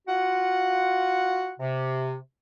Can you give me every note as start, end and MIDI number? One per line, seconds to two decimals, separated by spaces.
0.08 1.52 65
0.08 1.52 66
0.08 1.52 78
1.60 2.16 48